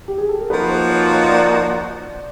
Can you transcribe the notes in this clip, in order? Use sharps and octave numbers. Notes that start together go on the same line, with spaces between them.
G4
G#4
A4
A#4
F3 A#3 D#4 F#4 B4
C5
C#5
C#5
D5